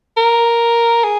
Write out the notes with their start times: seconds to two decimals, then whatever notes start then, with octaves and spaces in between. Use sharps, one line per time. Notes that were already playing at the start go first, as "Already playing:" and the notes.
0.17 A#4
1.04 G#4